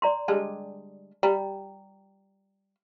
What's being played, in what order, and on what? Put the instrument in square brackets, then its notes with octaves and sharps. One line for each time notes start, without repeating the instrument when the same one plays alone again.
[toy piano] D5 A#5 C6
[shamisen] D3 G3 G#3 [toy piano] A5
[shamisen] G3 [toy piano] A#5